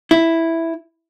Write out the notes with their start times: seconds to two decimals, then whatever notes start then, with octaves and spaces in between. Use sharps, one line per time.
0.11 E4